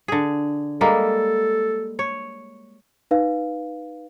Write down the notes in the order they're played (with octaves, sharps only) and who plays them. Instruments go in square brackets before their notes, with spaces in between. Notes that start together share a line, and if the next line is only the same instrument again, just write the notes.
[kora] D3 G#4
[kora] G3 G#3 A#3 [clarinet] A4
[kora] C#5
[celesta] D#4 B4 F5